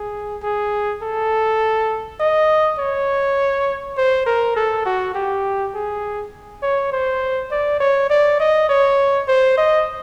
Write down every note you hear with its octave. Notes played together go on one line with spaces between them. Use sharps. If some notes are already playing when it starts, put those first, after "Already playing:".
Already playing: G#4
G#4
A4
D#5
C#5
C5
A#4
A4
F#4
G4
G#4
C#5
C5
D5
C#5
D5
D#5
C#5
C5
D#5